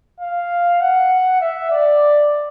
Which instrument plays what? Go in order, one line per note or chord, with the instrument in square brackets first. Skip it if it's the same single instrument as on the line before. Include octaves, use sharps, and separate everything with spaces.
[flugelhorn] F5
F#5
E5
D5